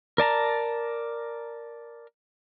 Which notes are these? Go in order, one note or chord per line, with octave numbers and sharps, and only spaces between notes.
A#4 D5 A5 A#5